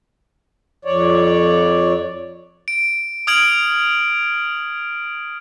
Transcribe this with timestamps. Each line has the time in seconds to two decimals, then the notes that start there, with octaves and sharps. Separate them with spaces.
0.85 F2 C#5 D5
2.68 D7
3.27 D#6 F6 G#6 D7 F#7